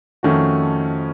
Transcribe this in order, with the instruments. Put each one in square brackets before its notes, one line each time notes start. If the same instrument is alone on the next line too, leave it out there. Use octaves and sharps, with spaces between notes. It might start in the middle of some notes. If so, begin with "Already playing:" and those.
[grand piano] F2 D#3 A3 C#4 F#4